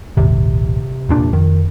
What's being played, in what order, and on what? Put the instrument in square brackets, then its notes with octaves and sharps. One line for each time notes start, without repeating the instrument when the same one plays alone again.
[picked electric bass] D#1 G#1 [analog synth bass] C3
[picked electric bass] E1 A#2 D4
[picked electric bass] F2 [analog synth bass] D#3